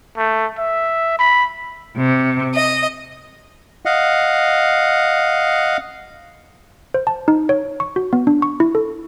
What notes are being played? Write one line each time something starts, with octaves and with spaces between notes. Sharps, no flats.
A3
E5
B5
C3
D#5
D#5 F5 F#5
C5
A5
D#4
C#5
C#6
F#4
B3
D4
C#6
E4
A4